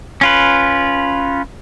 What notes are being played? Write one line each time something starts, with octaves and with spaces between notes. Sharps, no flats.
C#4 F4 B4